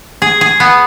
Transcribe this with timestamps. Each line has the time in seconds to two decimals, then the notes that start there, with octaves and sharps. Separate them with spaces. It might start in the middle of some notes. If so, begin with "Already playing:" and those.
0.22 G#4
0.41 G#4
0.60 B3